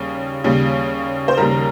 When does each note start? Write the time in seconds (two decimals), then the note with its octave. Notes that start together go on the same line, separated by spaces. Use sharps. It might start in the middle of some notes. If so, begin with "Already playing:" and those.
Already playing: D#2 C#3 G3
0.44 D#2 C#3 G3
1.28 C5
1.37 D#2 C#3 G3 A#4